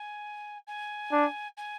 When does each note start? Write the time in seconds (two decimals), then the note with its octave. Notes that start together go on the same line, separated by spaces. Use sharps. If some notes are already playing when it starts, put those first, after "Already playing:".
Already playing: G#5
0.67 G#5
1.12 D4
1.57 G#5